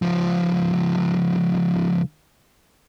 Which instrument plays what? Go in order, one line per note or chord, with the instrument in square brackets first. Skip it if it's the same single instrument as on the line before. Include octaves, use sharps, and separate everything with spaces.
[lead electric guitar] C#2 F3